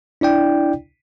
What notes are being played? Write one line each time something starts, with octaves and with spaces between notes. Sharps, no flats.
D4 E4 D5 G5